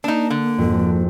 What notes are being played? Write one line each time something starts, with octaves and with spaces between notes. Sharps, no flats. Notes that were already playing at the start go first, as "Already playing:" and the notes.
A#3 D4 D#4
D3
G#1 F2